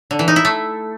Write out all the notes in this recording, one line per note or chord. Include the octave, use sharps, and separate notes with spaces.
D3
E3
D#4
E4
A3